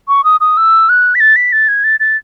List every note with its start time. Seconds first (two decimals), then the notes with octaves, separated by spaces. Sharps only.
0.08 C#6
0.24 D#6
0.41 D#6
0.57 E6
0.89 F#6
1.15 B6
1.20 A6
1.36 B6
1.53 A6
1.68 G#6
1.84 A6
2.00 A6